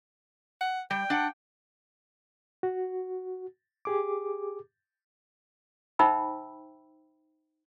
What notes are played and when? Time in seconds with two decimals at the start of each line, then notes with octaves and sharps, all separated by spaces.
0.61 F#5
0.91 G3 G5
1.10 D4 F#5
2.63 F#4
3.85 G4 G#4 D6
5.99 D#4 C5 E5 G5 B5 E6